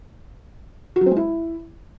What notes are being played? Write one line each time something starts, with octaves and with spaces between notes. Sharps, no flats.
F#4
F#3
C4
G#3
E4